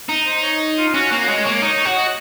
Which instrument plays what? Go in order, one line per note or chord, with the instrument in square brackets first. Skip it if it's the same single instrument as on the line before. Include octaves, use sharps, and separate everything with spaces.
[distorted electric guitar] D#4
[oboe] C5
C#5
F4
[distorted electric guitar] C#4 [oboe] F#4
[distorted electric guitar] A#3 [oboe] F#4
[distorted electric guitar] G#3 [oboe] C#5
[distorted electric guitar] A#3 [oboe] C#5
[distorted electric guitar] D#4 [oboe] C#5
[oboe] C#5
[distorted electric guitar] F#4
[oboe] D#5